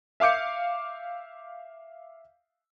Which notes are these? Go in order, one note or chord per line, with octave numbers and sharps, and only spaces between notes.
E5 F5 D6 G6 C#7